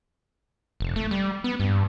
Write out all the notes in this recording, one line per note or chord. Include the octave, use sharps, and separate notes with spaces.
F1
A3
G3
B3
G2